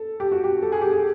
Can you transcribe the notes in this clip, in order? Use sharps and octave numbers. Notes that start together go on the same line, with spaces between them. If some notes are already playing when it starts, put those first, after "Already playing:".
Already playing: A4
G4
F#4
G4
A4
G#4
G4
G#4